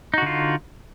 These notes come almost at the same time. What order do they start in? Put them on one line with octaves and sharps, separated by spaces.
D#4 F#4 D3 F4